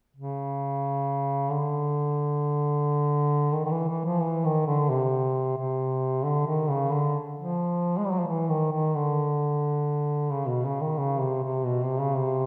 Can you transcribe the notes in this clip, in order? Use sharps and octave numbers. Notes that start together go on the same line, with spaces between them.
C#3
D3
D#3
D#3
E3
E3
F3
E3
D#3
D3
C3
C3
D3
D#3
C#3
D3
F3
G#3
G3
F#3
F3
E3
D#3
D#3
D3
C#3
B2
C#3
D#3
C#3
C3
C3
B2
C3
C#3
C3